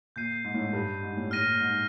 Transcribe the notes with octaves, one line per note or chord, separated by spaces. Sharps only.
A#2 G6 C7 D#7
G#2
A2
G#2
G2
G#2
A2
A2 F6 A#6 D#7
A#2
G#2